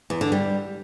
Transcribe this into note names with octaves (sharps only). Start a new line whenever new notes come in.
E2
D3
G3